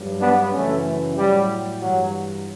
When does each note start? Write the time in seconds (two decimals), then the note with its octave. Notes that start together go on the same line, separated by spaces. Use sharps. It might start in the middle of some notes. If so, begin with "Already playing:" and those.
Already playing: G2 F#3
0.20 B3 D4
0.53 F#2 C#3 E3 A3 C#4
1.17 A2 F#3 G3
1.81 G2 E3 F#3